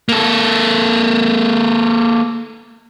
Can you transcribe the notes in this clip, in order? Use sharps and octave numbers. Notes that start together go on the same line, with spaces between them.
A#3 A4